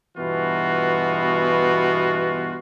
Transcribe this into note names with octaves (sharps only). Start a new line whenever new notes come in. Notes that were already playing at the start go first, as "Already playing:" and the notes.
G2 B2 E3 B3 F4 F#4